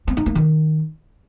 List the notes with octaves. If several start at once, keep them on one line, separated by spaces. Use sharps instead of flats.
C4
D#4
A#3
D#3